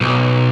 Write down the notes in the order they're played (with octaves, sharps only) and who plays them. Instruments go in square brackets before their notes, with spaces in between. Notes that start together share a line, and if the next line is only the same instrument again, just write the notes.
[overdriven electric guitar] B1